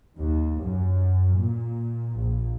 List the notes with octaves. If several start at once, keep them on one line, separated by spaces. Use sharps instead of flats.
D#2
F#2
A#2
A#1